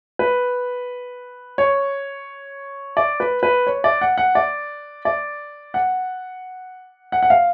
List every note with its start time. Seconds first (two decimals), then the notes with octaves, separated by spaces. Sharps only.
0.19 B4
1.58 C#5
2.97 D5
3.20 B4
3.43 B4
3.67 C#5
3.84 D5
4.01 F#5
4.18 F#5
4.35 D5
5.05 D5
5.74 F#5
7.12 F#5
7.22 F#5
7.30 F5